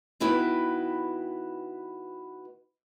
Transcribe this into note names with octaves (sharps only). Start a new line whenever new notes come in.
D#3 B3 E4 F#4 B4 G5